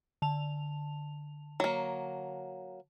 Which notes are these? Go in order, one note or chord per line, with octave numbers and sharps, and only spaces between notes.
D3 A5 F7
F#3 A#3